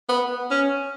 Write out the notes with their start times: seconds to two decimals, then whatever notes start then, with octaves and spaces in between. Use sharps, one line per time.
0.09 B3
0.51 C#4